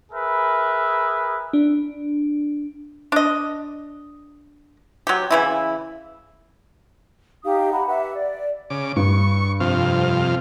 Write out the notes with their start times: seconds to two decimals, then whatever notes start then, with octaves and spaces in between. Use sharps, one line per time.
0.12 G#4 A#4 B4 E5
1.53 D4
3.12 D4 D#5
5.07 F#3 G4
5.31 C#3 E3 E4
7.44 D#4 G4 F5 D#6
7.72 F#5 A#5 B5
7.87 G4 B4 E5 F#5
8.15 D5
8.70 C#3 D6
8.96 G2 C#6
9.60 F2 C3 F5